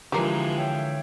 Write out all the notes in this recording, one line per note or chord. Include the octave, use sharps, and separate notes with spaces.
D3 E3 F3 G#3 G4 A#4
C#5 E5 G5